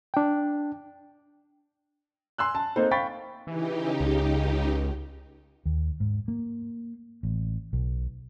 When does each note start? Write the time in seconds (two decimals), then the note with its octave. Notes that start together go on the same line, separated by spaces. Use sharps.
0.14 D4 G5
2.38 G#5 C6 E6 F#6
2.55 A5
2.76 A#3 C4 D#4 A4 C5
2.91 F5 G5 B5 C#6 A6 B6
3.47 C#3 E3 D#4 G4
4.00 C#2
5.66 D#2
6.00 G#2
6.28 A#3
7.23 A1
7.73 B1